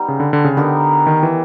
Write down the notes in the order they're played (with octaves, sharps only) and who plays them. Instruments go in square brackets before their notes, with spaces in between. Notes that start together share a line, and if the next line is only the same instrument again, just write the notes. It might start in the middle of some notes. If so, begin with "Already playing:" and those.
Already playing: [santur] G3 B3 D#4
[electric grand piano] C#3
D3
D3
C#3
[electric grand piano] D3 [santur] B3 D#4 G4 A#4
[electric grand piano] D#3
E3